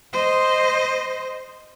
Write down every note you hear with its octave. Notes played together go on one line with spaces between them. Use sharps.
C5 D#5